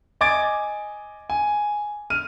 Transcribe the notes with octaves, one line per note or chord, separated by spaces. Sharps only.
D#5 G#5 D6 G#6 A6 D7
G#5
F6 D#7